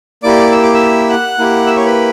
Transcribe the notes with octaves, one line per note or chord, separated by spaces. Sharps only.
A#3 E4 G4 D5 D6
E6
D6
E5 E6
F#5 F#6
A#3 E4 G4
E5 E6
C#5 C#6
B4 B5